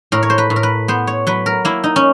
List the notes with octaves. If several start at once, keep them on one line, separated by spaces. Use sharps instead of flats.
A2 A#4
C#5
C5
B4
A2
A#4
B4
B3 C5
C#5
F#3 B4
A#4
A#3 E4
D#4
C#4